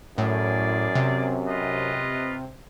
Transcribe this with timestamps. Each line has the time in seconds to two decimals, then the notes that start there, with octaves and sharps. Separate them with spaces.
0.18 F#2 A2 A#3 G#4 D5
0.95 C3
1.48 F4 B4 D#5